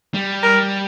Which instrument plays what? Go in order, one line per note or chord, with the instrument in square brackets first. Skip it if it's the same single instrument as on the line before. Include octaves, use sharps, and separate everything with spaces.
[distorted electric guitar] G3
[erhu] A#4